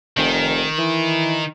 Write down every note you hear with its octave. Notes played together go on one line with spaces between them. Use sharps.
F1 D#3
E3